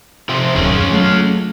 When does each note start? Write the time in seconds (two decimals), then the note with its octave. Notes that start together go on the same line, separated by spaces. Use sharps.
0.29 C3 F3 C4
0.56 D#1 F#2 C#4 F4 G#4
0.90 F#3 G#3 A3